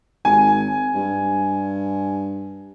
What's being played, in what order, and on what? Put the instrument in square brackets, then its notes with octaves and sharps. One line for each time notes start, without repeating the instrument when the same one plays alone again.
[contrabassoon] G#1 [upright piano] G#5
[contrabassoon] G2